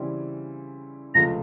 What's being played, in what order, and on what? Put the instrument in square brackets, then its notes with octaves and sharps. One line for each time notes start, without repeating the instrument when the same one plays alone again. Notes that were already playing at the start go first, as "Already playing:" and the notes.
Already playing: [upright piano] C#3 E3 G3 C4 E4
[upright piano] C#2 C3 F3 A3 [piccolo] A#6